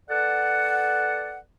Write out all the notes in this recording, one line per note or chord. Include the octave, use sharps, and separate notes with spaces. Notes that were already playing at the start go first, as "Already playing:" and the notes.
B3 A4 D5 F#5